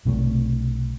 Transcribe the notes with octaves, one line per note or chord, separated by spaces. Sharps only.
B1 C3 E3 A3